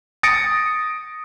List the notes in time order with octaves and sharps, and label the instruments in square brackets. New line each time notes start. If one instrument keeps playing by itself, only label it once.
[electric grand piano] D#6 A6 A#6 C#7 D7